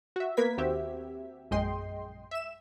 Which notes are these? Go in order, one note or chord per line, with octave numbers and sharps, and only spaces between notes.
F#4 E5
A#3 B3 A#4 B4 G#6 B6
D#2 C4 F#4 G4 E5
A#1 F#2 G#3 D#5 G5 C6
E5 E7